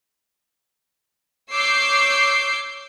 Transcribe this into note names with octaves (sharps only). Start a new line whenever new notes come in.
C#5 D6 E6 G6 C7